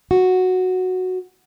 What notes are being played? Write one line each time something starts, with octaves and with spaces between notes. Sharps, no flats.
F#4